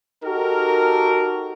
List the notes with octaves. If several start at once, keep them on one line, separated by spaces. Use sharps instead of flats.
D#4 F#4 G4 A4 A#4